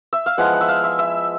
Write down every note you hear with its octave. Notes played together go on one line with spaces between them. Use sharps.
E5
F5
F3 G#3 B3 E4 F#5
F#5
E5
F5
E5
E5